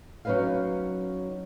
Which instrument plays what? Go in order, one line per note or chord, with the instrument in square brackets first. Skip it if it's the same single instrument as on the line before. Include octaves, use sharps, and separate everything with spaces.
[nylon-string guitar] F#3 C#4 D#4 B4 D#5 F5